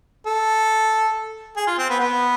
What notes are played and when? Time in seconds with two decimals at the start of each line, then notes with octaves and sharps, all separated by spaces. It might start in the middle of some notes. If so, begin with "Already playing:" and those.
0.26 A4
1.57 G#4
1.67 F4
1.78 C4
1.90 B3
2.00 B3